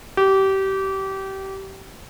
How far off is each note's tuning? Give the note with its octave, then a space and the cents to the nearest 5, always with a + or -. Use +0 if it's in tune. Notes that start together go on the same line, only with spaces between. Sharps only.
G4 -25